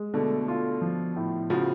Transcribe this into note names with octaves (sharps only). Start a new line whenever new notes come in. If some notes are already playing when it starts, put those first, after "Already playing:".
Already playing: G#3
B2 D3 A3
F4
F3
A2
C#3 F3 F#4